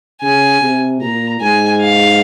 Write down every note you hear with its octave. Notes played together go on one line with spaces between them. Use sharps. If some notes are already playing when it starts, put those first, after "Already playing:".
C#3 G#5
C3
A#2 A#5
G#2 G#5
F5